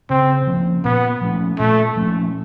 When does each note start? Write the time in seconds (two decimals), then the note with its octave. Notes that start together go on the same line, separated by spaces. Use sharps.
0.10 C#3 C4
0.47 F3 A#3 C#4
0.84 A#2 B3
1.21 F3 A3 C#4
1.59 A#2 A3
1.96 F3 A3 C#4